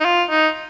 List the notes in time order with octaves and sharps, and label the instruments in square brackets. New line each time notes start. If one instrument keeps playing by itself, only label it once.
[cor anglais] D#4
F4
D#4